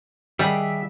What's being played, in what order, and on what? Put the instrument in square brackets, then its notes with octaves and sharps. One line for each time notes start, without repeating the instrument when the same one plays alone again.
[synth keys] D#3 D#5 D7 [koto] G3 [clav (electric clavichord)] G4 G#4 F#5 [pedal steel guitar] E5